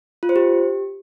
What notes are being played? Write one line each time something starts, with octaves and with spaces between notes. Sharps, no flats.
F4
C5
G4